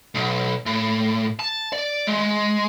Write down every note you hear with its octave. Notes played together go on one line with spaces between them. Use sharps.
B1
A2
A5
D5
G#3